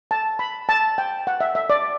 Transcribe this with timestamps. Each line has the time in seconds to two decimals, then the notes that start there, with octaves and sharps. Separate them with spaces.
0.11 A5
0.39 B5
0.69 A5
0.98 G5
1.27 F#5
1.41 E5
1.55 E5
1.70 D5